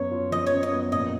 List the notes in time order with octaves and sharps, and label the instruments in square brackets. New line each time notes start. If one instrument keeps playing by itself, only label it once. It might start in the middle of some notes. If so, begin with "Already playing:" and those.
Already playing: [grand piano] F#2 B3 [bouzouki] C#5
[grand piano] F4
[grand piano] F3 [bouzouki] D#5
[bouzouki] C#5
[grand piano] F#2
[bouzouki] D#5
[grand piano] B3
[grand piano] A#2 [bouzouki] D#5